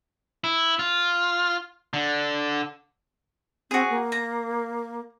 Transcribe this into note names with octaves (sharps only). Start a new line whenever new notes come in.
E4
F4
D3
C4 F#4 G#4
A#3
A#5